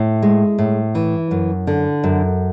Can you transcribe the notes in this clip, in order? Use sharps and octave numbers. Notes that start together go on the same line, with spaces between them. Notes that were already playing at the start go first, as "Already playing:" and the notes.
Already playing: A2
G#3
A2
E3
F#2
D3
F#2